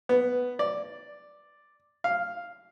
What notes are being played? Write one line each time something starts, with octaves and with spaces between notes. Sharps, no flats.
B3
D5
F5